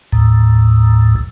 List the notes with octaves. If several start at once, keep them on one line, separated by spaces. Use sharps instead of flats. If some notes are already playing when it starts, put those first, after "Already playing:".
D#2 A2